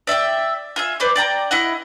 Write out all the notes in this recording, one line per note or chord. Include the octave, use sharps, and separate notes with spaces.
D5 E5 F5 G5
F4 G#4 E5
B4 C5 D5 D6
D5 G5 A#5
E4 D#5 F#5